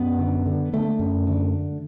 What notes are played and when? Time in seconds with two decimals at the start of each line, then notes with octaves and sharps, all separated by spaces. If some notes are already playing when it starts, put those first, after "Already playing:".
Already playing: F#2 B3
0.19 D3
0.46 D3
0.73 D3 A3
0.99 F#2
1.27 D3